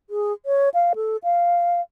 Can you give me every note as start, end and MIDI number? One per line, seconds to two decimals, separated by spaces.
0.10 0.33 68
0.46 0.69 73
0.74 0.93 77
0.95 1.17 69
1.24 1.81 77